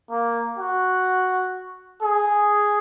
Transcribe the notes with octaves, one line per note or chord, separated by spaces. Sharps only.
A#3
F#4
G#4